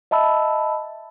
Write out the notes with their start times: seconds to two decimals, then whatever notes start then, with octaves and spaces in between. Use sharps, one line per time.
0.11 D#5 E5 A5 B5 E6